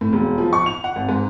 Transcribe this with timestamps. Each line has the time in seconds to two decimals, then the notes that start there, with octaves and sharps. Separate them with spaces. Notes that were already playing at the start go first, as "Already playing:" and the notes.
0.01 A2
0.13 E1
0.38 F3
0.53 C#6
0.66 F7
0.84 F#5
0.96 G#1
1.09 G#2